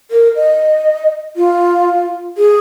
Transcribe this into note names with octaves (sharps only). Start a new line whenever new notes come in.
A#4
D#5
F4
G#4